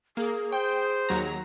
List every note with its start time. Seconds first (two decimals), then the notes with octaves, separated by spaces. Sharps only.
0.17 A#3 G#4
0.52 C5 G5
1.09 D#2 F#3 A#5